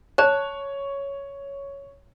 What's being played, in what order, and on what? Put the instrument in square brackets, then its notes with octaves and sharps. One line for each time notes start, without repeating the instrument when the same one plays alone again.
[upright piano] C#5 [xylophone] A5 F#6